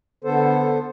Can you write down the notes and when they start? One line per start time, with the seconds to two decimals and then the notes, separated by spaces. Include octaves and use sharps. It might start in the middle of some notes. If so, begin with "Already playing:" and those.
0.24 D3 B3 A4 C5